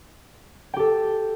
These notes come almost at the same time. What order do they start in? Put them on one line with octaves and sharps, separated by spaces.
G5 G4 A4